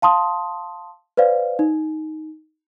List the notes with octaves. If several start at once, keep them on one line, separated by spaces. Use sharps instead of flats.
F5 A5 C6 D#6
B4 C5 D5 F5
D#4